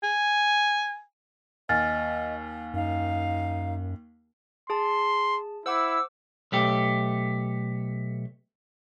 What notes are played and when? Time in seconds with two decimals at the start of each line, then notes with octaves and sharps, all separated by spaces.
0.04 G#5
1.69 D#2 D#5 G#5 F6 A6
2.73 F#2 D#4 F5
4.70 G#4 A5 C6
5.66 E4 C5 F#5 D6 E6
6.52 B1 A3 G4